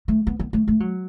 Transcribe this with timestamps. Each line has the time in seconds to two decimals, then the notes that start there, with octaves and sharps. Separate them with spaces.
0.08 A3
0.27 B3
0.39 B3
0.53 A3
0.68 A3
0.80 F#3